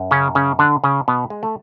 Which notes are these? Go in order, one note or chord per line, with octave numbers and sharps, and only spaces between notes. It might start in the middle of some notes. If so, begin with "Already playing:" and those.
Already playing: F#2
C#3 C#4
C#3 C#4
D3 D4
C#3 C#4
B2 B3
G#3
A3